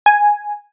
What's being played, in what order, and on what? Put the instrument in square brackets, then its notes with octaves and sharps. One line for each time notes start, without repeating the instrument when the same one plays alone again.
[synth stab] G#5